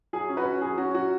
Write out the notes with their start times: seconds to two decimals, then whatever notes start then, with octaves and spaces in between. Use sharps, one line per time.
0.13 F#3 G#4
0.29 C#4
0.37 F#4 B4
0.45 C#4
0.61 F#3 G#4
0.78 C#4 F#4
0.95 F#3 F#4